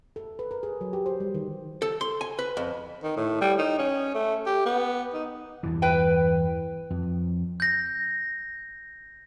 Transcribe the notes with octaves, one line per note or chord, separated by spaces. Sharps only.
A4
B4
A#4
G#4
F#3
G4
C5
G3
D#3
A4
C6
G#5
B4
F2
D#3
A2
G3
D#4
C#4
A3
G4
B3
D#4
E2 G2 E3
B4 G5
F2
G6 A#6